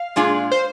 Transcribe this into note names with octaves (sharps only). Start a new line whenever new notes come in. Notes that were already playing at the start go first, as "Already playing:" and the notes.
Already playing: F5
A#2 G#3 D4 F4 G#4
C5